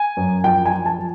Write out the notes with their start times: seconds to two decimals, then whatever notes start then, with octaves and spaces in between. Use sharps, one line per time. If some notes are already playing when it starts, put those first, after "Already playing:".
Already playing: G#5
0.17 F#2
0.44 F3 G5
0.66 G#5
0.72 F3
0.86 A5
0.99 F3